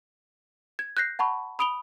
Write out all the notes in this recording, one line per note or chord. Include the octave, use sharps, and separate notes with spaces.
G#6
F#6 G6 A#6 C7
F#5 A5 B5 C#6
B5 D#6 D7 F7 G7